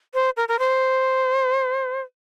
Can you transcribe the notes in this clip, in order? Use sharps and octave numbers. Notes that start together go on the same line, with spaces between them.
C5
A#4
A#4
C5